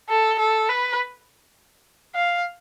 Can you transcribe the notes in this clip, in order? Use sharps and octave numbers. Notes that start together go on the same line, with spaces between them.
A4
A4
B4
F5